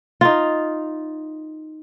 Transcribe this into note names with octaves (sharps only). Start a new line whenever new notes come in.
D#4 F4